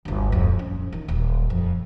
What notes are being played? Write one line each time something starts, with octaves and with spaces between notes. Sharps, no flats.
G1 D2
D1 F2
C#4
D#3
D#1
F2